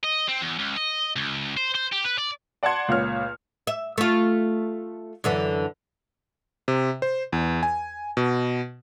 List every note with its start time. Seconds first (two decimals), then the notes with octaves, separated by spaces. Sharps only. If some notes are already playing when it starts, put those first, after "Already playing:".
0.04 D#5
0.28 C4
0.42 E2
0.59 C#2
0.77 D#5
1.16 C#2
1.57 C5
1.75 C5
1.92 G4
2.04 B4
2.18 D5
2.63 D5 F#5 A5 C6 G#6 C#7
2.88 C#2 A#2 C#5 F6
3.67 E5
3.98 A3 F4
5.24 F#2 D3 E3
6.68 C3
7.02 C5
7.33 E2
7.63 G#5
8.17 B2